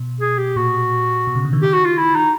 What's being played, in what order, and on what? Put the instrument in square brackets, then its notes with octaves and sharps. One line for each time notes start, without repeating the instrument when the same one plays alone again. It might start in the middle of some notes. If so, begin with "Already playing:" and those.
Already playing: [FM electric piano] B2
[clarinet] G#4
G4
[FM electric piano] A#2 [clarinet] F#4
[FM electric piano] B2
C#3
D3
D#3
[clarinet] G4
F#4
F4
E4
D#4